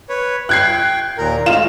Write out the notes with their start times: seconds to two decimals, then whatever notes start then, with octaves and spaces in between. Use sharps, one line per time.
0.09 B4 C#5
0.49 G5 F#6 G#6 C7
1.18 D#2 A#2 A#4
1.46 A2 G#3 F4 E7